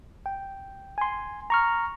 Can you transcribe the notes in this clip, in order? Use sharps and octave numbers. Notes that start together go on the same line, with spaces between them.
G5
G#5 C6
A#5 C#6 F6